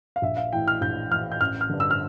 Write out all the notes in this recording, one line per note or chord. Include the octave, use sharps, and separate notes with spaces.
F5
A#1 E5
F5
A2 E3 G5
F6
A#1 G6
A2 E3 F6
G6
A1 F6
F6
G2 D3
E6
F6